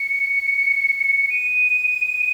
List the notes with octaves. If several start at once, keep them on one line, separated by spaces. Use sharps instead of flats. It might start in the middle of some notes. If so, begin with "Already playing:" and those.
Already playing: C#7
D#7